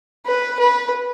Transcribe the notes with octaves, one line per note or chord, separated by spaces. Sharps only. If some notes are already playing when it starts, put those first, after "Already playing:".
B4
B4